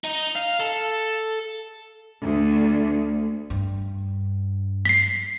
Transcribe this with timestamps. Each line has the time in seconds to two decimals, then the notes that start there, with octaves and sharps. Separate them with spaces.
0.04 D#4
0.35 F5
0.60 A4
2.24 D2
3.50 G2
4.85 B6 C7